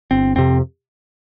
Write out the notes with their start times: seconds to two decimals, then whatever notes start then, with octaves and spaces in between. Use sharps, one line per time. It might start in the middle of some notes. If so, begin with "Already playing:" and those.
0.11 G1 C4
0.36 F2 C3 C4